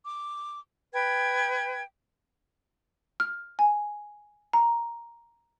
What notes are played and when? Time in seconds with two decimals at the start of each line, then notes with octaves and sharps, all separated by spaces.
0.06 D6
0.94 B4 G5 G#6
3.20 F6
3.59 G#5
4.53 A#5